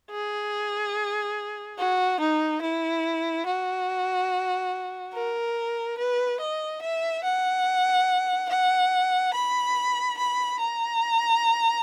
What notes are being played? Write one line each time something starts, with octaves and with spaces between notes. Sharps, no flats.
G#4
F#4
D#4
E4
F#4
A#4
B4
D#5
E5
F#5
F#5
B5
B5
A#5